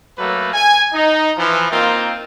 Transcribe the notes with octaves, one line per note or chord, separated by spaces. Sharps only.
F#3 A3 A#3 B4
G#5
D#4
E3 F3
A#3 C4 D#4 F4